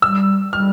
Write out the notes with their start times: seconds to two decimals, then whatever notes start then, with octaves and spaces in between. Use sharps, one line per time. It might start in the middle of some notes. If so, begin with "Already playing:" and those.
0.02 G3 E6
0.53 G3 F6